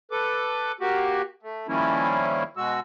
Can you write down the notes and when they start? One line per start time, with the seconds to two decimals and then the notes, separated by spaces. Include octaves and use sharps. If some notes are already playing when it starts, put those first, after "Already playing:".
0.11 A4 B4 D6
0.80 A#3 F#4 G4
1.43 A3
1.68 D#3 F3 G3 A#3 C#4 E4
2.57 B2 G#3 F#4 E6